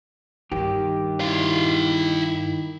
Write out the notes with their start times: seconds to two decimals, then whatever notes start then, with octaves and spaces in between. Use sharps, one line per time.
0.52 G2 D#3 G4
1.20 E4 F5